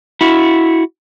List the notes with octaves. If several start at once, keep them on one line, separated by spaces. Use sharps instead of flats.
E4 F#4